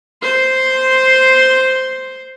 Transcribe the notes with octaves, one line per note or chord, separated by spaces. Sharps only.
C5 C6